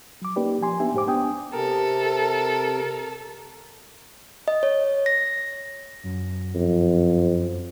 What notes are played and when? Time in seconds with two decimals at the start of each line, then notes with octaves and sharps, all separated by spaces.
0.22 F#3 D6
0.36 A#3 C#4 D#4 G4 B4 D5
0.62 F3 G#5 C6
0.80 B3 D4 D#4 G4 E5 G#5
0.94 G#2 G4 C5 D6
1.07 B3 D4 G5 G#5 D#6
1.54 C3 A4 A#4
4.48 D#5
4.63 C#5
5.06 A#6
6.03 F#2
6.55 F2